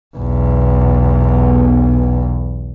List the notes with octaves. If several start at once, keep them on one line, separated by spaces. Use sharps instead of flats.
B1 E2